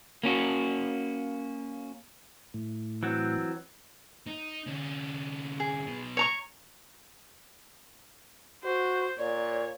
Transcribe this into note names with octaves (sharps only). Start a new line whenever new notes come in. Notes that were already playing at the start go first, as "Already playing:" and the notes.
A#3 C#4 F#4
A2
E3 F#3 C4
D#4
D3 C#4
G#4
B1 B2
C#5 A#5 C#6
F#4 C5
A#2 C#5 D5